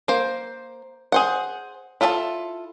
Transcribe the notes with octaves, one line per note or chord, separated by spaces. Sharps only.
A#3 C5
G#4 C5 F#5
E4 F4 A4 E5 A5